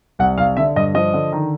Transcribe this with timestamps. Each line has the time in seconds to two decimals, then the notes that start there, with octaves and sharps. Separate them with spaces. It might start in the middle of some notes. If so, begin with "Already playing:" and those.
0.19 C2 F#5
0.38 C2 F5
0.57 D3 E5
0.76 G2 D#5
0.94 F3 D#5
1.14 D3
1.32 D#3